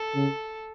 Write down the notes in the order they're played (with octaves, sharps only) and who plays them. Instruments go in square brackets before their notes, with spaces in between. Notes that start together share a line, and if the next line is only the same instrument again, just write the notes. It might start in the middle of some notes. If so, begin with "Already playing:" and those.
Already playing: [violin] A4
[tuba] C#3